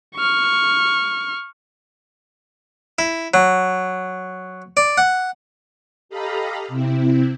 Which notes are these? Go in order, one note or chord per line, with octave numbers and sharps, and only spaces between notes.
C#6 F6
E4
F#3
D5
F#5
G4 A4 D#5 F5 A#5 B5
C3 C4 E4